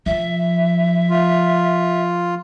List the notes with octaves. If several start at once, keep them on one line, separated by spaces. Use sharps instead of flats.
F3 E5
F4